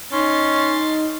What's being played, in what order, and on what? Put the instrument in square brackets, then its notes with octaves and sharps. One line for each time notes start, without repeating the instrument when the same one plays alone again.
[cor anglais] C#4 [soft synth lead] D#4 [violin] C6 A6